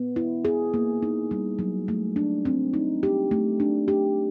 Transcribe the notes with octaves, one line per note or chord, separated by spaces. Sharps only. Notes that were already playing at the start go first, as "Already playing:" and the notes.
Already playing: B3
E4
G#4
A#3
D#4
G3
F#3
A3
D4
C4
D#4
G4
A3
D4
G4